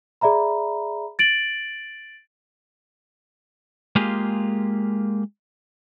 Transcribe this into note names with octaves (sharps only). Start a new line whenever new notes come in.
G#4 D5 E5 A#5 B5
A6 D7 F#7
G#3 A#3 F4 G4 G#4